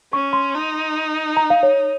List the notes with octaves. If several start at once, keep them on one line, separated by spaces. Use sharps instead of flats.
C#4 C#6
C6
D#4
A#5
F5
C#5